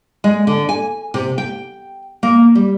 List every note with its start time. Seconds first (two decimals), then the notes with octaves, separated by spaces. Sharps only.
0.24 G#3
0.47 D3
0.69 G#5
1.14 C3
1.38 G5
2.23 A#3
2.55 G3